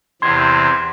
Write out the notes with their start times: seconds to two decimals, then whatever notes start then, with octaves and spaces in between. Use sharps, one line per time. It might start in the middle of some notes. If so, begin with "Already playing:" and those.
0.22 E2 C3 C6 G#6